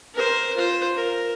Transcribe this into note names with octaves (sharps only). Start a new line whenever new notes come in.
A#4 C5
F4 C5
A#4